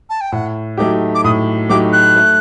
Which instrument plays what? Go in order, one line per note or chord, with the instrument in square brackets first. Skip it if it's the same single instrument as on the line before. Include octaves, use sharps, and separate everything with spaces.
[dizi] A5
G5
[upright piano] A2 [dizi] F#5
[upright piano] F#3 A3 D#4 G4 [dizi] D6
[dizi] D6
[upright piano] A2 [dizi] D#6
[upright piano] F#3 A3 D#4 G4 [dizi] D6
[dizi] F#6
[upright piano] A3